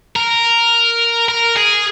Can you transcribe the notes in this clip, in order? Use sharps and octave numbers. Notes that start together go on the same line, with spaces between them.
A#4
A#4
G#4